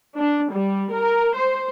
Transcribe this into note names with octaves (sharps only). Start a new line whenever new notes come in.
D4
G3
A#4
C5